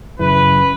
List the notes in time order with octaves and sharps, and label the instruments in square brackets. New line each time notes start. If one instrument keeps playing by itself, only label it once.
[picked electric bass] F#2 C#3 E3 [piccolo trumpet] B4